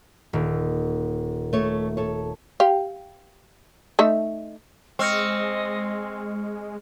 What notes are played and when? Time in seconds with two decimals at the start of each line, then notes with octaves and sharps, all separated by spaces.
0.33 D#1
1.53 A3 C#5
1.97 A4 C#5
2.60 G4 F5
3.99 A3 D#4 E5
4.99 G#3 C4 D#5 C#6 F6 C#7